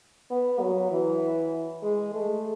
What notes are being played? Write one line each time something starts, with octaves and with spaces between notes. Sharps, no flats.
B3
F#3
E3
G#3
A3